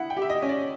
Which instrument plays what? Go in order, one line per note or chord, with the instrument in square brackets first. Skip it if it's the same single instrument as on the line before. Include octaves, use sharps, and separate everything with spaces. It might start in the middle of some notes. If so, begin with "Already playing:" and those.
Already playing: [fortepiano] E4 [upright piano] F#5
[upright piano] G5
[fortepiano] G4
[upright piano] E5
D#5
[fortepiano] C#4
[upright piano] D5